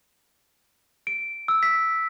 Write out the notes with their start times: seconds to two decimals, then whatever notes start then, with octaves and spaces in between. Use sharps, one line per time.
1.07 D7
1.48 E6
1.63 B6